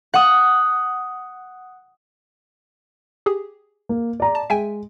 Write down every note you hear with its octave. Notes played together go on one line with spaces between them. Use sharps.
F#5 D#6
G4 G#4
A#3
D5 A#5
A5
G#3 E5 G5 G#5